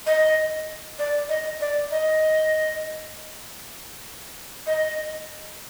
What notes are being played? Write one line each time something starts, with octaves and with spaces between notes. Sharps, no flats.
D#5
D5
D#5
D5
D#5
D#5